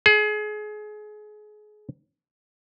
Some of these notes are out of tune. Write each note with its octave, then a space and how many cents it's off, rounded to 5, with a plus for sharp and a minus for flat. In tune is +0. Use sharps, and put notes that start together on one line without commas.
G#4 +30